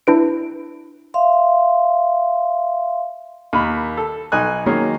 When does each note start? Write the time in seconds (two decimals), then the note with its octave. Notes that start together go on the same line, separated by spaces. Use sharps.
0.07 D4 E4 B4 D7
1.14 E5 F5 C6
3.53 D#2 A#3 B5
3.97 A4
4.32 B1 D#4 D#5 G#5 F#6
4.66 D#3 F#3 G#3 A#3 C#4